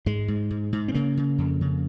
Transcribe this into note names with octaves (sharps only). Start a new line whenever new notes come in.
G#2 G#3
G#2
G#2
G#2
C4
C#3 A#3
C#3
F2
C#3